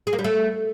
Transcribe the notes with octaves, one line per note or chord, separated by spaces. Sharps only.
G#4
A#3
G3
A3